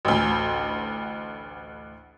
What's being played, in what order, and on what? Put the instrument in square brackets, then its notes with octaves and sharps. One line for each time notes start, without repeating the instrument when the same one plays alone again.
[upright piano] A1 D2